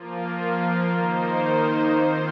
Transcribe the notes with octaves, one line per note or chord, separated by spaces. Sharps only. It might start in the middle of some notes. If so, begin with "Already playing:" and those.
Already playing: F3 A#3 F4
D#3 A#3 D#4 C5
D#3 C4 F4